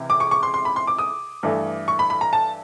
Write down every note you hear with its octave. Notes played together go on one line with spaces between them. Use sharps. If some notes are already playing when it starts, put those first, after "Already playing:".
Already playing: C#2 C3 E3
D6
C#6
C#6
C6
C6
B5
C6
D6
D#6
G2 E3 A3
C#6
B5
B5
A#5
A5